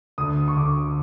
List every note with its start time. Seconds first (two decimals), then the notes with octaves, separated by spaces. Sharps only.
0.18 D2 D#6
0.48 C#6
0.56 D2 D6